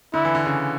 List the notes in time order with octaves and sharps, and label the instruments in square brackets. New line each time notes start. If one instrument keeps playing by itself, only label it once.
[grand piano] D3 [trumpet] E4
[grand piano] E3
D3
C#3